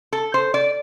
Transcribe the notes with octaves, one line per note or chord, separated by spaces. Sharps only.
A4
C5
D5